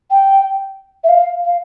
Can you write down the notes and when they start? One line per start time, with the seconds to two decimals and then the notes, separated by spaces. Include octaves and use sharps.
0.11 G5
1.04 E5
1.09 F5
1.45 F5